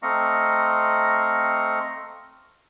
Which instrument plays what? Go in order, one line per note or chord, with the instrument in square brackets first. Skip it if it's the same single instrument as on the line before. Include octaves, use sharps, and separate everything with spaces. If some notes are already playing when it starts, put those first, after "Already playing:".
[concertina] A3 C4 D#5 F5 A#5 C#6